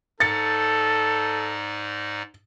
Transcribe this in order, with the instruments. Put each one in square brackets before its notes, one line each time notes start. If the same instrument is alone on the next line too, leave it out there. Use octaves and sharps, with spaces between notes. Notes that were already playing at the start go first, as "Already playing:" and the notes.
[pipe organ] G#2 D#4 D5 [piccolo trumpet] A4 [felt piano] A6 C#7